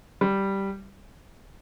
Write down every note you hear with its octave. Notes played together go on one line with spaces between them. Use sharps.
G3